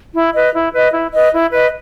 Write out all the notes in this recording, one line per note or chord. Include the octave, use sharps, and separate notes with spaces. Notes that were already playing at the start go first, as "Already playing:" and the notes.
E4
B4 D#5
E4
B4 D#5
E4
B4 D#5
E4
B4 D#5